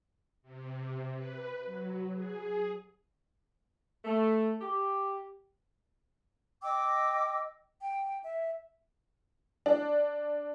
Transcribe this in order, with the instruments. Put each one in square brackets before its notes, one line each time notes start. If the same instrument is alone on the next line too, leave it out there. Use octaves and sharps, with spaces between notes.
[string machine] C3
B4
F#3
G#4
[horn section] A3
G4
[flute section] D#5 G5 D6 E6
G5
E5
[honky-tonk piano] D4